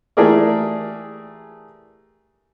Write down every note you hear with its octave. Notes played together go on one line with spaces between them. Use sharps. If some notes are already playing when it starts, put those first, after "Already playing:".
E3 A3 G4 G#4 A#4 D5